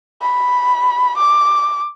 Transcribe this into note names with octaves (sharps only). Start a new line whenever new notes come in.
B5
D6